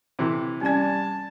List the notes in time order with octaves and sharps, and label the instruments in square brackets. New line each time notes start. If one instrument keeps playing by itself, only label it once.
[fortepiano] C3 E3
[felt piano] G3 D5 G#6 [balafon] C#4 G#5 [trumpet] A5